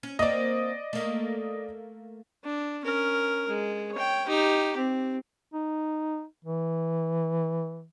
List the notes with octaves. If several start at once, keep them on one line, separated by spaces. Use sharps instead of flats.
C#4
A#3 C4 D5 D#5
A3 A#3
D4
C#4 A#4
G#3
C#5 G5
D#4 G4
C4
D#4
E3